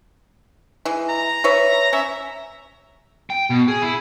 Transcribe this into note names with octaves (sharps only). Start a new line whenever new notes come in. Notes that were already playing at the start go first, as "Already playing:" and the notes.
E3 G#3
A#5
B4 C#5 E5
C#4 E5
G5
B2
G#4
E4